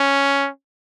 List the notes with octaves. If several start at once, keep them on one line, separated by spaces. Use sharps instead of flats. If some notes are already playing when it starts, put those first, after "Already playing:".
Already playing: C#4